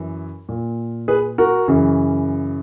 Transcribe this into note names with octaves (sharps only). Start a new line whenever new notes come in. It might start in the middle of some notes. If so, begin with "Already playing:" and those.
Already playing: F#2 E3
A#2
G#4 B4
F#4 A#4
F#2 C#3 E3